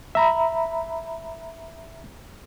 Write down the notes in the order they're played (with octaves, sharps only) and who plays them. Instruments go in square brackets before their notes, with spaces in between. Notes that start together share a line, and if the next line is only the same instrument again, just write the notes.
[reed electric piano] E5 A#5 B5